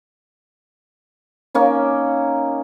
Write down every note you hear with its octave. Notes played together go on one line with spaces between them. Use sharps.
A#3 C#4 D#4